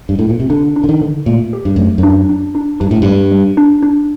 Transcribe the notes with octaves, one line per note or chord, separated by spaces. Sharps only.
G2
A2
A#2
C3
D3 D4
D4
D3
D#3
D3
A#2 A3
G4
G2
F#2 A3
F#2
D4
D4
D4
G2 D4
A2
G2 G3
G3
D4
D4